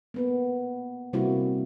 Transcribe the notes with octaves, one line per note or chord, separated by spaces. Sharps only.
A#3 B3 B4
C3 G3 A#3 C4 E4 F#4